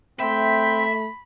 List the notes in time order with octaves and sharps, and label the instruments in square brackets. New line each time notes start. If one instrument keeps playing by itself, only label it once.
[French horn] A3 [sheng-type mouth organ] C4 G5 G6 [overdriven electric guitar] E5 [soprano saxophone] B5